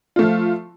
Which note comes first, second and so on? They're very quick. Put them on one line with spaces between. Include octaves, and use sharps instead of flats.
F4 A3 F3